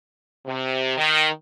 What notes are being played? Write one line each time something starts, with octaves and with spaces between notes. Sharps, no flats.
C3
D#3